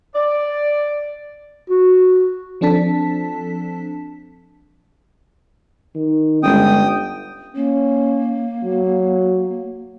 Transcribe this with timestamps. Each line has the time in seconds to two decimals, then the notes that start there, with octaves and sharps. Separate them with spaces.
0.14 D5
1.70 F#4
2.61 F3 C4 D4 A4 A5 B6
5.95 D#3
6.43 G1 G#3 C#4 G5 D#6
7.56 A#3 C#4
8.64 F#3